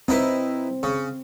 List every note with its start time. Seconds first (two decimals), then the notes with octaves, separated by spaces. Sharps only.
0.08 C4 D#4 E4 B4
0.83 C#3